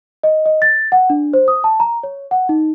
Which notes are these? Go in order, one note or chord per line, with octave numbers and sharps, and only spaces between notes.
D#5
D#5
A6
F#5
D4
C5
D#6
A5
A#5
C#5
F#5
D#4